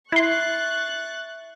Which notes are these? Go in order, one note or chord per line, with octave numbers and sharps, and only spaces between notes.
E4 E5 C6 C#6 F#6 A6